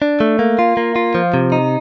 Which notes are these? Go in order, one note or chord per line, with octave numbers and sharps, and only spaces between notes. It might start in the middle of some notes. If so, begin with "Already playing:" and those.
D4
A3
A#3
F4
A#3
F4
F3
C3
D#4